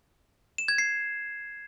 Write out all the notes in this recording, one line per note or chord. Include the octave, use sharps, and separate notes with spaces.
E7
G#6
C7